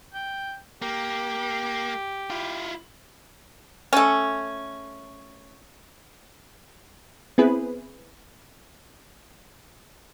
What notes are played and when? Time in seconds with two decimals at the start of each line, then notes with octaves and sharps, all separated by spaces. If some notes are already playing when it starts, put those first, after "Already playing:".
0.14 G5
0.82 A#3 G4
2.30 E4 F4
3.93 A3 C#4
7.38 B3 C4 E4 G#4 B4